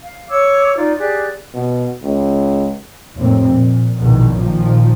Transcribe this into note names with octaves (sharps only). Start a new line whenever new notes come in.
F5
C#5 D6 E6
D#4 F4 D5
G4 G#4 D5 F#6
B2
C#2
F1 F2 A2 A#3 C4
A#2
A#1 E2 B2 D#3
A#2 D#3 F3